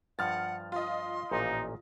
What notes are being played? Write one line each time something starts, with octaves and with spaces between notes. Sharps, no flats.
G2 F3 F#5 F6 A6
F4 D#5 C6
A1 A#2 F3 D#4